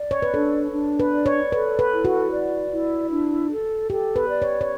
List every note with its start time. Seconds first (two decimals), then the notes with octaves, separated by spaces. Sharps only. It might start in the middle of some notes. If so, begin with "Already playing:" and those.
Already playing: D5
0.11 C#5
0.22 B4
0.33 D4 A4
0.73 D4
0.99 B4
1.12 D5
1.26 C#5
1.52 A4 B4
1.79 B4
1.92 E4
2.05 F#4
2.31 D5
2.70 E4
3.11 D4
3.49 A4
3.90 G4 A4
4.16 B4
4.29 D5
4.42 C#5
4.61 C#5